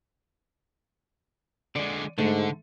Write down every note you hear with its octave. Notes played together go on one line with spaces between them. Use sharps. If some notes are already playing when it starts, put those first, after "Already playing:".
D3 G#3 D5
G#2 D3 A3